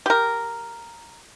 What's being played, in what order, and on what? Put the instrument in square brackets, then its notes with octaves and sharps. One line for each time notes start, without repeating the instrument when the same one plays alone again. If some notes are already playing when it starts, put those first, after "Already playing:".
[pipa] G4 A#4